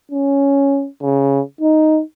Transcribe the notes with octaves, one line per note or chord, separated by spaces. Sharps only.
C#4
C#3
D#4